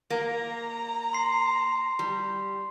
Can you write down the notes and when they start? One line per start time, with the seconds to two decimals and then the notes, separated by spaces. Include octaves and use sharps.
0.10 A#3 A#5
1.13 C6 C7
1.99 G3